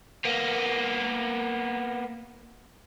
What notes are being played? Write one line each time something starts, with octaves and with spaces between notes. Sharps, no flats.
A#3 B3